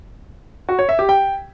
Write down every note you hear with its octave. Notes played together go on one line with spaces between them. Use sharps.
F#4
C#5
E5
G4
G5